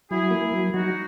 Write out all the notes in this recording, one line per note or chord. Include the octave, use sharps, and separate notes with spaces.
F#3 E4 G#4
A#3
F#3
F#3 D#4 F#4